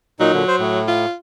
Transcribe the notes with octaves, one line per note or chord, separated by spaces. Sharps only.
A#2 F#3 D#4
A#2 D3
C5
A2
F4